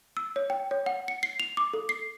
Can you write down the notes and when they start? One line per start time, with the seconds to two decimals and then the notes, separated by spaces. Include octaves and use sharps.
0.17 E6
0.36 C#5
0.50 G5
0.71 C#5
0.86 F#5
1.08 C#7
1.23 C7
1.40 F7
1.57 D6
1.74 A4
1.89 C7